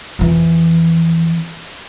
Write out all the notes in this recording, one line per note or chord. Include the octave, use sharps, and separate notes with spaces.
F2 E3